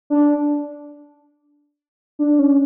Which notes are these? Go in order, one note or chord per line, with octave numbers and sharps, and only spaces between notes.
D4
D4
C#4